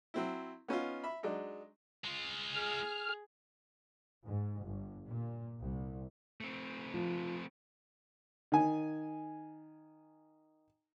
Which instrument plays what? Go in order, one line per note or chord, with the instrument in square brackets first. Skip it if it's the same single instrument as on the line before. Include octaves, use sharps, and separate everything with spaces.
[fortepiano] F#3 C4 E4
B3 C#4 D#4 F4
E5 B5
F#3 G#3 D4 D#4
[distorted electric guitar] G#3 F4
[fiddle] G#4 [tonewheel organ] F6
[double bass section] G#2
G1
A#2
C2
[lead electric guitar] A3 C4
[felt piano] F3
[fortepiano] D#3 G#5